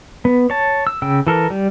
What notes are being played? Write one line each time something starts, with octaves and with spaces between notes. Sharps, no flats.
B3
C#5 A5
E6
C#3 G5 E6
E3 A4 A#4
G3